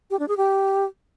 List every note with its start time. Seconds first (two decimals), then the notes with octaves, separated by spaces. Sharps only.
0.10 G4
0.19 D4
0.28 G#4
0.37 G4